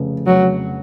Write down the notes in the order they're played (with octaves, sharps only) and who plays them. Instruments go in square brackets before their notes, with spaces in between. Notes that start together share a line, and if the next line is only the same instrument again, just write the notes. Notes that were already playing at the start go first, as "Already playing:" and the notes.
Already playing: [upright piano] F1 F2 C#3
[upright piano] F1 [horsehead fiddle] F#3